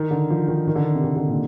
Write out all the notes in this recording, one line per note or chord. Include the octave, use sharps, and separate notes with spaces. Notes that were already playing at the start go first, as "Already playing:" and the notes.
Already playing: D#3
D3
F3
D#3
D#3
D3
C3
D#3
D3
A#2